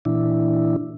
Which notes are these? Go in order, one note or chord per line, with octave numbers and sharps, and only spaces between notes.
A#2 E3 D4 E4